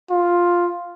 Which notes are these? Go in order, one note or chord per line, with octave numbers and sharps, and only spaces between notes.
F4